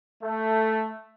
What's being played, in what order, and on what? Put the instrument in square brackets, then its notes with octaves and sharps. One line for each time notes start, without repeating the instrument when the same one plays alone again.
[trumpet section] A3